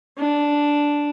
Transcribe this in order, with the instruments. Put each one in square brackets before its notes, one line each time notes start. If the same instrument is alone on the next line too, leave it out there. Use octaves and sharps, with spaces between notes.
[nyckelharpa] D4